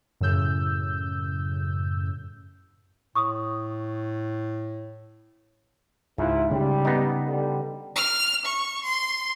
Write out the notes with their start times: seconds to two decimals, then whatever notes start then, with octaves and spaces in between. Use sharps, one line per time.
0.21 F#2 A2 C#3 E6 G6
3.15 A2 C#6 D#6
6.18 C#2 G#2 C3 E4 F4
6.51 C#3 G3
6.85 B3 D#4
7.27 D3 G3
7.96 F6
8.45 C#6
8.84 C6